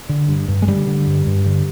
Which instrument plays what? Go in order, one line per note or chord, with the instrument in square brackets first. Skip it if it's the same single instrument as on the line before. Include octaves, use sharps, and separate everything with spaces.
[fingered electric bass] D3
G2
G2
G#3
D3 G3
D3
G2
G2
D3